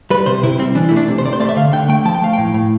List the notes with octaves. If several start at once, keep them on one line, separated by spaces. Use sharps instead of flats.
G3 B4
C3 C5
C3 E4
G3 C4
E3 D4
E4
A3
D4
C3
C5
C3 D5
C5
A3 D5
E5
D3 F5
D3 G5
A3 G5
F3 A5
G5
A3 F5
A2 G5
A2